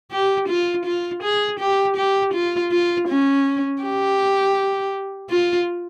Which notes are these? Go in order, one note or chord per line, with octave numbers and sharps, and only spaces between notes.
G4
F4
F4
G#4
G4
G4
F4
F4
C#4
G4
F4